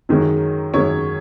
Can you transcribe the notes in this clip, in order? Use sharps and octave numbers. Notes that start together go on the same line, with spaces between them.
F#2 D#3 G#3 C#4
F#2 D#3 G#3 C#4 C#5